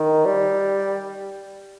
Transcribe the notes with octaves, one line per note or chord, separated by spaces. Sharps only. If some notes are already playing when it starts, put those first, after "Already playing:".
Already playing: D#3
G3